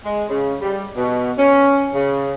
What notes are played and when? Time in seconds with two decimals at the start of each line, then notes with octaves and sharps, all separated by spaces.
0.05 G#3
0.30 C#3
0.60 G3
0.97 B2
1.38 C#4
1.94 C#3